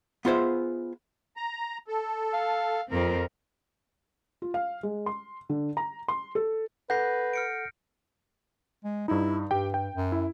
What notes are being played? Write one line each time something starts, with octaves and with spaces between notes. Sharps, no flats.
B3 F4 G#4 C5 E5
A#5
A4
F5
F2 F3 C4 A#4
F4
F5
G#3
C6
D3
A#5
C6
A4
A4 B4 F#5 G6 A#6 C7
F6 C#7 D7
G#3
G2 D#4 E4
G2 G4 G5
G5
F#2
E4